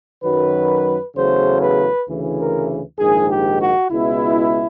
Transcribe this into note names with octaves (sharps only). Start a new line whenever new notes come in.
F#2 D#3 F#3 B4
E2 C#3 F#3 A3 C5
B4
D2 C#3 E3
A#4
A#1 G#2 D#3 G#4
G4
F#4
C#2 B2 G#3 B3 E4